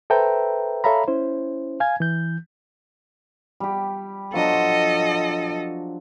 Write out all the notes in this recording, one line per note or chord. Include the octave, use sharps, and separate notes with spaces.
A4 B4 C5 E5 G5 A#5
A4 C#5 E5 F5 A#5 B5
C#4 E4 C5
F5 G#5 G#6
E3 G6
G3 G4
F3 F#3 D4 A4 D#5